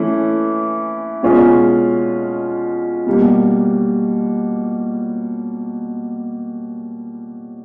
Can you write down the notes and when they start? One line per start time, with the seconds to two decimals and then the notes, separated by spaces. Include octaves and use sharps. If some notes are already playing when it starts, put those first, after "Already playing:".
Already playing: E3 A3 C#4 E4
1.23 B2 G#3 C#4 F4 G#4
3.06 B2 G3 A#3